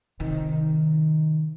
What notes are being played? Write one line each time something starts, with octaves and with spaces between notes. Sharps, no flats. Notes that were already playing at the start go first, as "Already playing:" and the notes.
C3 D#3